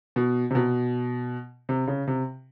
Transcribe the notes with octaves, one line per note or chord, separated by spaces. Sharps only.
B2
C3
B2
C3
C#3
C3